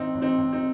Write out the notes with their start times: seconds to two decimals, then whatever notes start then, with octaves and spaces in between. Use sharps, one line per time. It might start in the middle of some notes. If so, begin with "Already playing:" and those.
Already playing: A1 C4 D#4
0.14 A1
0.22 C4 D#4
0.38 A1
0.53 C4 D#4